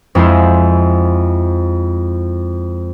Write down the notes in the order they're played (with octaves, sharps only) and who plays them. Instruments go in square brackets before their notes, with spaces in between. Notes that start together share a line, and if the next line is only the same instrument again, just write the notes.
[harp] F2 G#3 E4 C5